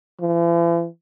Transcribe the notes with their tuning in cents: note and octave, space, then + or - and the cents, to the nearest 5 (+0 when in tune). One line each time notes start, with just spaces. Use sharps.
E3 +45